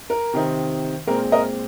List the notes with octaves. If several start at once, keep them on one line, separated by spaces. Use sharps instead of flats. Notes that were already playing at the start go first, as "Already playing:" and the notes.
A#4
C3 D#3 C4 D#4
A#2 G#3 C4 A#4
A#4 D#5